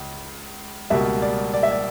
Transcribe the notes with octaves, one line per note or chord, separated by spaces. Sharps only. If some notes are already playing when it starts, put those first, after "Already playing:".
Already playing: C#2
C#2 B2 G3 A#3 E5
D5
D5
E5
D5